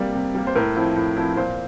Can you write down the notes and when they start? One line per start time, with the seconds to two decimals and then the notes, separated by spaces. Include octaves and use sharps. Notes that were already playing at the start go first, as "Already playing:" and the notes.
Already playing: C3 G3 A#3 D5
0.14 C3
0.35 G3 A#3
0.47 C5
0.55 A2 A#4
0.76 F3 C4 E4
0.96 A2
1.17 F3 C4 E4
1.37 A#2 C5